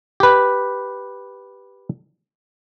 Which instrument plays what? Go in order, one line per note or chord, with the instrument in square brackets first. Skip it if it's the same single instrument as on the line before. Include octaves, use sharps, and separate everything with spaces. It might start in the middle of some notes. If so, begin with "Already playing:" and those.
[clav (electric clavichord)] G4 B4